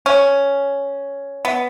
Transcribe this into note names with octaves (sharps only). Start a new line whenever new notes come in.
C#4
B3